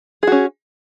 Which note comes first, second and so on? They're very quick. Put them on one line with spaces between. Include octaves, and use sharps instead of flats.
G#4 F#4 C#4